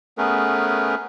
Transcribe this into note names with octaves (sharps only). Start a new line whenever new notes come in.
A3 B3 C#4 G#4 A#4 B4